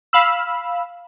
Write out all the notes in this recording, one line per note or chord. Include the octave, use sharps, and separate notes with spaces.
F5 B5 E6